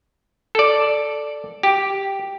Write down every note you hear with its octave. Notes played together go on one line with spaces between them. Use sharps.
A4 D5
G4